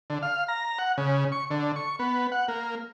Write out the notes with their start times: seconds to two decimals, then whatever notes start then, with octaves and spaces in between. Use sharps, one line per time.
0.10 D3
0.22 F5
0.48 A#5
0.79 F#5
0.98 C#3
1.32 C#6
1.51 D3
1.76 C#6
1.99 B3
2.32 F#5
2.48 A#3